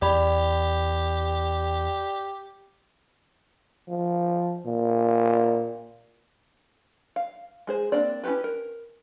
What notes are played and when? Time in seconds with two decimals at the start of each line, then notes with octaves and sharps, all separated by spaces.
0.02 E2 G4 D5 B5
3.88 F3
4.66 A#2
7.16 F5
7.67 G#3 G#4 C5
7.92 A#3 C4 D4 D5
8.24 C#4 E4 F4 G4 B4
8.44 A#4